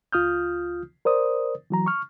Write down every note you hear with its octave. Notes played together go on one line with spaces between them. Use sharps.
C#2 F4 D#6 F6 G6
A#4 C5 D5 D#6
E3 F#3 A#5
C#6 F6